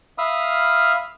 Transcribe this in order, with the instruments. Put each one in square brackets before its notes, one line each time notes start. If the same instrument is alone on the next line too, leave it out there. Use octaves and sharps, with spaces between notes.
[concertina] E5 F5 B5 D#6 F6